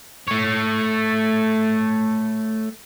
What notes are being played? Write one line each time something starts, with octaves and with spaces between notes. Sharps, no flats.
A3 C#5